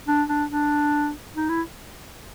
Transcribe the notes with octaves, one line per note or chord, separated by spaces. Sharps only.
D4
D4
D4
D#4
E4